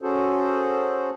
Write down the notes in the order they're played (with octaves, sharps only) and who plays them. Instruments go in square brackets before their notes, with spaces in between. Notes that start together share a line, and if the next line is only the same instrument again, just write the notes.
[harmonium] C#4 F#4 G#4 A4 C5